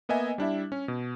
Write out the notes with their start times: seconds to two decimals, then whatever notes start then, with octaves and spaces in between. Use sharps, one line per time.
0.09 A#3 B3 D#5 E5 G#5
0.38 G3 D4 E4 E5
0.72 C#4
0.88 B2